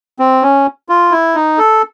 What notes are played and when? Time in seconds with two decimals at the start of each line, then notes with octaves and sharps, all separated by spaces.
0.19 C4
0.42 C#4
0.89 F4
1.12 E4
1.35 D#4
1.58 A4